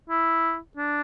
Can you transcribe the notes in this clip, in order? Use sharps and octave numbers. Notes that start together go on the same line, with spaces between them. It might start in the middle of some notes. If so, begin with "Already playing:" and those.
E4
D4